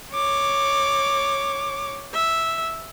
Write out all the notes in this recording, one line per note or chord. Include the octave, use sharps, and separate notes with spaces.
C#5 D6
E5